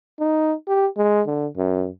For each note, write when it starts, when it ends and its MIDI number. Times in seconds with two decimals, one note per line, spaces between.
0.20 0.53 63
0.68 0.87 67
0.98 1.22 56
1.27 1.47 50
1.57 1.88 42